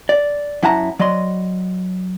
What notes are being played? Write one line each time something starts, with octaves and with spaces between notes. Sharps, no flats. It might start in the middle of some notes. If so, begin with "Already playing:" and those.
D5
F#2 E4 F#5 A5 A#5
F#3 D5 D#5 C6